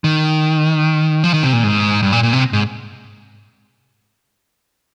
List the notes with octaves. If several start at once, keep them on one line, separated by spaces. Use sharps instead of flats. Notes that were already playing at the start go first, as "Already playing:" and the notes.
D#3
F3
D#3
C3
A#2
G#2
G2
A#2
A#2
C3
G#2